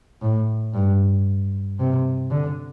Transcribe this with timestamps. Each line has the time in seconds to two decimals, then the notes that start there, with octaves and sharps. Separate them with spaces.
0.22 A2
0.74 G2
1.79 C3
2.31 D3